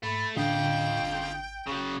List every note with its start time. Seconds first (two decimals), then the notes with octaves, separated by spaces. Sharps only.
0.03 G#2 A3 B5
0.37 A2 D3 F4 D#5 G5
1.02 G#1
1.67 F#1 C#3 F#3